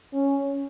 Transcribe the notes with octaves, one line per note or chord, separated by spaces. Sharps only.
C#4